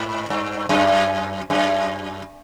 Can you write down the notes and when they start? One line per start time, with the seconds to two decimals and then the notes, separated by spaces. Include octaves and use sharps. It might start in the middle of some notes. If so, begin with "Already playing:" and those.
Already playing: G#2
0.30 G2
0.69 F#2
1.50 F#2